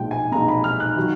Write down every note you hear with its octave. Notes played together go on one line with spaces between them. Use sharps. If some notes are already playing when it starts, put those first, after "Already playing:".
Already playing: B1 A#2 F3 G#3 G5
G#5
B1 A#2 F3 G#3 A#5
B5
F6
F#6
D#3 F#3